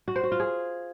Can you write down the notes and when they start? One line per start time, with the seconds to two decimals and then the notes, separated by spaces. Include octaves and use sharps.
0.08 F#4
0.16 C5
0.24 F#4
0.32 F4
0.40 G#4